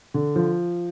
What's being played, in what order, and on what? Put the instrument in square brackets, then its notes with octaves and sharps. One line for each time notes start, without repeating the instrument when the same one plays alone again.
[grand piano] D3
F3